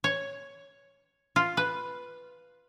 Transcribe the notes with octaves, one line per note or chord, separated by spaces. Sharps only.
C#5
F4
B4